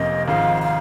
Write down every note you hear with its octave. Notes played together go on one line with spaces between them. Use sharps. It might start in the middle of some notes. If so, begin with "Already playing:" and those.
Already playing: F1 F2 F3 A#3 C#4 D#5
G#1 G#2 F3 F5
F5